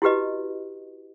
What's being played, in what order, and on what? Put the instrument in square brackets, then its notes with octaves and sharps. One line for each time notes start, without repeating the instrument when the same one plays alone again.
[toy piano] E4 F#4 G4 B4 D#5